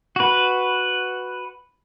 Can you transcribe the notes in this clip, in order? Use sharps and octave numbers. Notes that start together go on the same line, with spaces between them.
F#4 B4